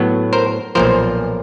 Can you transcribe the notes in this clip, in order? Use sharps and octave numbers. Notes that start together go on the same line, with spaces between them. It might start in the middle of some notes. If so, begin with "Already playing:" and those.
Already playing: A2 F#3 B3
A#4 C5
B1 A#2 F3 A#4 C5